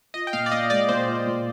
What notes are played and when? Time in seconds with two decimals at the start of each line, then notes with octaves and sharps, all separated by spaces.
0.14 F4 D#5
0.27 G5
0.33 A#2 F5
0.46 D5
0.52 A#2 D#5
0.70 G#3 D5
0.89 A#2 C5
1.07 F4
1.26 A#2